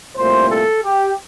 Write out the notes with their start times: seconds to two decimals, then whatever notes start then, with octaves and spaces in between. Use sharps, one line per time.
0.17 C2 A#2 A3 C5
0.49 A4
0.83 G4